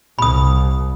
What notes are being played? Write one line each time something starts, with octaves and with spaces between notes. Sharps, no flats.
C2 B5 D#6